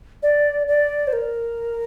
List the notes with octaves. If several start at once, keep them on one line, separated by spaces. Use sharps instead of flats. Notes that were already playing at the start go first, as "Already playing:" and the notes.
D5
D5
C5
A#4